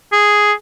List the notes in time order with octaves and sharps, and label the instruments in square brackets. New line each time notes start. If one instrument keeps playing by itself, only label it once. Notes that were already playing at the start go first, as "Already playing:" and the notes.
[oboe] G#4